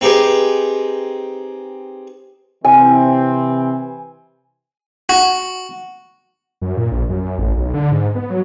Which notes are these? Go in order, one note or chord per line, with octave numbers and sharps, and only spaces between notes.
C4 D#4 G4 G#4 B4
C3 E3 C4 G#5
F#4
F#2
A#2
A#1
F#2
A1
B1
D3
G#2
B3
F#3